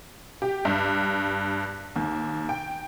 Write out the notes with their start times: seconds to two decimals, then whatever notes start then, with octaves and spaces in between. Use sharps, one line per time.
0.42 G4
0.65 G2
1.96 D#2
2.49 G5